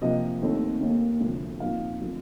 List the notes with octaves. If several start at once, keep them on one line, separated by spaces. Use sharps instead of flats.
C3 F3 A#3 D#5
D#2 D#3 A3 C4 D#4
D#2 D#3 A#3 D#4
D2 C3 F3
A#2 F3 C4 D#4 F5
D3 F3 A3 C4